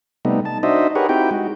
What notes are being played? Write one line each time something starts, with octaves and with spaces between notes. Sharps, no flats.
C3 G3 A3 B3 D#4
A5
D4 D#4 F#4 C5 D#5 E5
G4 G#4 A#4 B4 C#5 F#5
C4 D#4 E4 F#4 G4 G5
G#3 F#4